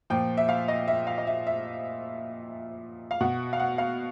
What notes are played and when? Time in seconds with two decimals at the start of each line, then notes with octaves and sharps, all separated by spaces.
0.10 A#2 F3 G5
0.37 E5
0.49 F5
0.68 D#5
0.88 E5
1.07 F5
1.18 D#5
1.27 E5
1.47 E5
3.11 F5
3.21 B2 F#5
3.53 F5
3.60 F#5
3.78 F5